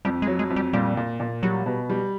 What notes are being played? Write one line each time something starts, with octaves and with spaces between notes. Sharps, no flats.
F2 G3
G#3
F#3
G#3
F2
G3
A#2 G3
A#2
A#2
F#3 G3
B2
G3